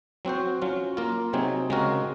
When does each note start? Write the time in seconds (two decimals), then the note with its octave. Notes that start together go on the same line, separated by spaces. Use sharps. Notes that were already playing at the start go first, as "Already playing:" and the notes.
0.25 F#3 C4 F#4 C5
0.62 F#3 C#4 F4
0.97 A#3 F4 A#4
1.33 C3 F#3 C4 D#4 G#4
1.70 C#3 G#3 C4 F#4 A#4